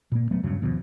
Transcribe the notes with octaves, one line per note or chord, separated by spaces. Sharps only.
A#2 A#3
D#1 F#3 A3 B3
E1 G2 C#3 F#3
D#2 B2 E3 F3